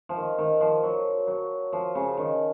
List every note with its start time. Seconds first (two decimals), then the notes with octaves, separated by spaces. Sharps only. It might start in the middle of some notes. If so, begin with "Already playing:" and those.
0.09 F3
0.16 D#3
0.39 D#3
0.61 F3
0.83 F#3
1.27 F#3
1.73 F3
1.95 C#3
2.18 D#3